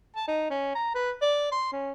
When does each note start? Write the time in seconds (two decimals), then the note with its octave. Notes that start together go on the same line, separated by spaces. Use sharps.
0.16 A5
0.28 D#4
0.50 C#4
0.75 A#5
0.95 B4
1.22 D5
1.52 C6
1.72 C#4